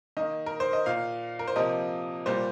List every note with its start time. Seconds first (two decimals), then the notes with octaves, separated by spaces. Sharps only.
0.17 D#3 A#3 D#5
0.46 A#4
0.60 C5
0.73 D#5
0.86 A#2 A#3 F5
1.39 A#4
1.48 C5
1.56 C3 F3 A#3 D#5
2.25 A#2 G3 A#3 C5